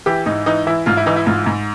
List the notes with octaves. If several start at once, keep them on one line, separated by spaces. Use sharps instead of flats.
E3 G4
G#2 D#4
E3 D#4
E3 E4
G#2 F4
E4
E3 D#4
E4
G#2 F4
G#2